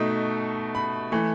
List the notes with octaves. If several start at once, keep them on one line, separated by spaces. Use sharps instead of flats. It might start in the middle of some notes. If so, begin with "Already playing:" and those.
Already playing: B2 A3 D#4 E5
B5
E3 A3